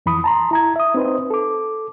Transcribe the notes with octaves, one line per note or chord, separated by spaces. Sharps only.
F2 E3 B5 D#6
A5 A#5 C6
E4 A#5 G#6
E5 D#6
C4 D#4 B4 C5
A4 D6